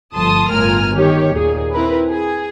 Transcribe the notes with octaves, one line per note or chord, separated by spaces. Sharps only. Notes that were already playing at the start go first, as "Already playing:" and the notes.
G1 F3 A3 A5 C6 D#6
G1 A2 F4 A#4 G#5 F6
D#3 G4 C#5
D#2 A#2 G#4
C4 E4 A#4 B4
G#4